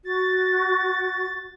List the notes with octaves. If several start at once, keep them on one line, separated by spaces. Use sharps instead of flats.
F#4 A6